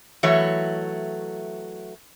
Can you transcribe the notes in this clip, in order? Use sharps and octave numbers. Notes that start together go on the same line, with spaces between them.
E3 F#3 A3 C#5